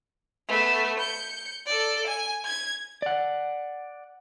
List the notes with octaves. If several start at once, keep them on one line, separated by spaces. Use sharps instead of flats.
A3 B3
G6 C#7
A4 D5
G#5
G#6
D5 F#5